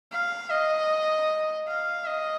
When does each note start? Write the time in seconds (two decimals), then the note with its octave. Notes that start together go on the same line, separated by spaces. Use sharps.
0.12 F5
0.50 D#5
1.68 F5
2.05 D#5